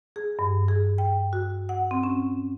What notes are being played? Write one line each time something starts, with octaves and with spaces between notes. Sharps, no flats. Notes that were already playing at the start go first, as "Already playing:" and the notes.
G#4
G2
G#4
G5
F#4
F#5
C4
C#4